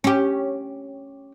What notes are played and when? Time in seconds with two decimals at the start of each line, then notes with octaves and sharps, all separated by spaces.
0.04 C#4 G4